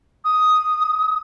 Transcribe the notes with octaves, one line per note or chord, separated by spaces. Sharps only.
D#6